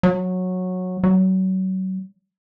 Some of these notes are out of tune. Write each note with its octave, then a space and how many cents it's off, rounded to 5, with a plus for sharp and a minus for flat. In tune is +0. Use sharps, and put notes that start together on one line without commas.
F#3 -15
F#3 +30